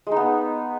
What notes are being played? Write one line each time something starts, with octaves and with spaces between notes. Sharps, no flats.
G#3 B3 D#4